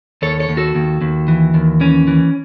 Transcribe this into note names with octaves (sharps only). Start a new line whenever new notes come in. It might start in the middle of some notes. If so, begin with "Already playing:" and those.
D#2 A4 C#5
A4 C#5
D#2
F#4 A4
D#2
D#2
E3
D#2
E3 C#4
E3